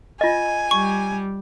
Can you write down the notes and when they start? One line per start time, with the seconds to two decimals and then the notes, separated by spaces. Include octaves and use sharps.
0.21 F4 D#5 G#5
0.71 G3 C#6